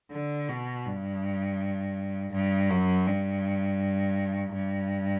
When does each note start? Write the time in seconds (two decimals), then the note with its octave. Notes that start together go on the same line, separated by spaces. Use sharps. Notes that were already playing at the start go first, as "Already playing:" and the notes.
0.12 D3
0.49 B2
0.85 G2
2.32 G2
2.70 F#2
3.06 G2
4.53 G2